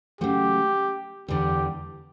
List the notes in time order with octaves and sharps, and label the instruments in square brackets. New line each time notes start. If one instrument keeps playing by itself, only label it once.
[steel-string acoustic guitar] C#3 F#3 A3 [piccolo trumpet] G4
[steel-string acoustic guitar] E2 D3 G3 [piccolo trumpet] G4